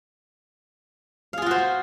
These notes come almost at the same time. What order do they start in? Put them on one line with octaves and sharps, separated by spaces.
F5 G#4 F4 F#4 C5